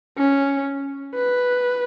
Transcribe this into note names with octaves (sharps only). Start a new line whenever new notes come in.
C#4
B4